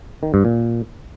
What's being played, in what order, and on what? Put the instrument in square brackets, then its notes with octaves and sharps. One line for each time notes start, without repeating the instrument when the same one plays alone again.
[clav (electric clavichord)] D#3
G2
A#2